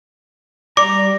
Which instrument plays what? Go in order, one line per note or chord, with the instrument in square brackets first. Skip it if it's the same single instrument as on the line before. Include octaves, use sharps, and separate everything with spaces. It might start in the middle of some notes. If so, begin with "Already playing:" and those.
[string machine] G3 [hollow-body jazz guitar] D5 [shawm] A#5 [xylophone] D6